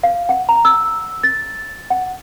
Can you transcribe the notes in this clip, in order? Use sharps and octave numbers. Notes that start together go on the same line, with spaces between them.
F5
F#5
A#5
E6
A6
F#5